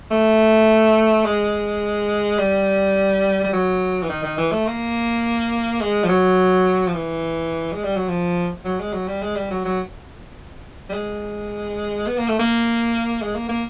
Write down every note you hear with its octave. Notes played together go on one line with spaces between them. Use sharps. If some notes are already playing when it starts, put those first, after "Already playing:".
A3
G#3
G3
G3
F#3
E3
D#3
D#3
E3
A3
A#3
G#3
F3
F#3
F3
E3
G#3
G3
F#3
F3
F#3
G#3
F#3
G3
G#3
G3
F#3
F#3
G3
G#3
B3
A#3
A3
A#3
G#3
A#3
A#3